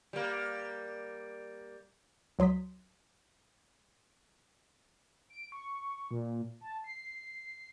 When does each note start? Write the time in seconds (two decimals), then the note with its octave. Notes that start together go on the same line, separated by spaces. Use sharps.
0.13 G3 A#3
2.39 C#2 F#3 C6 D#6 B6
5.30 D7
5.52 C#6
6.11 A#2
6.61 A5
6.84 C7